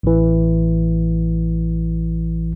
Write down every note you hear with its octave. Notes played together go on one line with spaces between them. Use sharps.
A1 E3